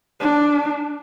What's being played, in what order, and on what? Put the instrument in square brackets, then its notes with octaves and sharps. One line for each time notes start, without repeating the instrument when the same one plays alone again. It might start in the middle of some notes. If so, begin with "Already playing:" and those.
[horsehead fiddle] D4